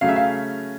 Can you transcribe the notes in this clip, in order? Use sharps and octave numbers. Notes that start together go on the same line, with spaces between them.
C#3 F#3 A3 C#4 F5
E5
F5